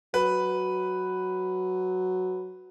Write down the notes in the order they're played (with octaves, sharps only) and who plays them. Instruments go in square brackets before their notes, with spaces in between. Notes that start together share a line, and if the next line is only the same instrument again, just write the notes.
[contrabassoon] F#3 [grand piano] B4